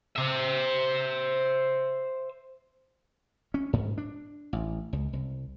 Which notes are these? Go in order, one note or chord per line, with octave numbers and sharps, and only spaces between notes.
C5 E5
C#4
G#2
D4
A1
C#2
C2